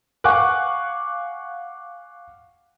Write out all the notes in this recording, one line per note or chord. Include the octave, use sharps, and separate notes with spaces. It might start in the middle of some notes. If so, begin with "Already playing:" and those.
F5 F#5 G#5 C#6 D6 F#6